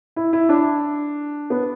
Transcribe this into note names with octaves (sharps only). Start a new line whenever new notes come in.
E4
E4
D4
B3